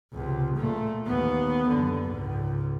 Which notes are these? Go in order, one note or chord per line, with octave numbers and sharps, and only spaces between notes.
C#2 C3
A#2 A3
D#2 B3
F#2 D3
C#2 G#2